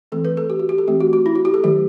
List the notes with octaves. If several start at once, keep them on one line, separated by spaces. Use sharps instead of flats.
E3 A3 C4 A4
B4
A4
G4
F#4
G4
A4
E3 A3 C4 G4
F#4
F#4
E4
F#4
G4
A4
D#3 F#3 A3 G4